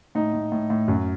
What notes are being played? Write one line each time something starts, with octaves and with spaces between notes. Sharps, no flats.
A2 D#4
A2
A2
A2
F#2